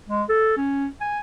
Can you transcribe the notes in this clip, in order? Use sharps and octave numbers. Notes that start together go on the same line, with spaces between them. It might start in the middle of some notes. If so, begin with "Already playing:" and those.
G#3
A4
C#4
G#5